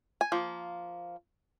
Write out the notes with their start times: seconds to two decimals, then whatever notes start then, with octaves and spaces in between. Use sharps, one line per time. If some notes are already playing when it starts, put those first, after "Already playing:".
0.21 G#5
0.32 F3 A#3